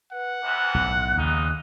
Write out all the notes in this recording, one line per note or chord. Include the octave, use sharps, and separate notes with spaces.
B4 F#5
E2 C3 E3 F#6
B1 A2
A#1 D#2 C#3 D#4